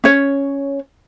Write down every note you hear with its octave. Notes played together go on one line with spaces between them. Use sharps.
C#4 C#5